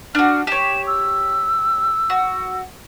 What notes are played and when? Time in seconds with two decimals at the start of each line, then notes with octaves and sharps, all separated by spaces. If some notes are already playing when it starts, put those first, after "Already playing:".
0.15 D4 F#4 F6
0.47 G4 C#5 E7
0.87 E6
2.10 F#4